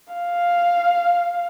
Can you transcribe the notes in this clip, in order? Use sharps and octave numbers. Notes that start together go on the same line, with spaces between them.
F5